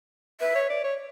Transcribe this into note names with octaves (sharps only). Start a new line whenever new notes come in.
B4 E5
C#5
D5
C#5